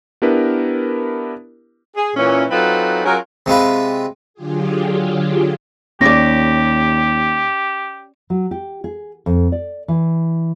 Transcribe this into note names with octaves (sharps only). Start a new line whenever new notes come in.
B3 D4 E4 G4 A#4 B4
G#4
A#2 E3 C#4
F#3 C4 D#4 F4 A4 B4
F#3 C#4 F4 G#4 A#4
C3 G#3 F4 B4
D3 F#3 F4 G4 G#4
D#2 C#4 G4 D5 A#6
F#3
G4
G#4
F2
D5
E3